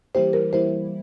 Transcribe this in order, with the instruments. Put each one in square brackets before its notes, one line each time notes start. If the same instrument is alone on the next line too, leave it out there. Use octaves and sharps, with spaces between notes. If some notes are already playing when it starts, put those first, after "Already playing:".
[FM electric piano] E3 G3 A#3 E4 G4 [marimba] C5
[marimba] A#4
[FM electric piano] E3 G3 A#3 E4 G4 [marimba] C5